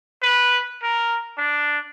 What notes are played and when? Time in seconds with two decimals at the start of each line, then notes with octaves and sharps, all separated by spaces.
0.23 B4
0.82 A#4
1.38 D4